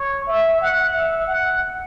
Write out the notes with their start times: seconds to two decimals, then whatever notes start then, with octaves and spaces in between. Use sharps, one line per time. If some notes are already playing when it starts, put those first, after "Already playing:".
Already playing: C#5
0.27 E5
0.61 F#5
0.94 E5
1.27 F#5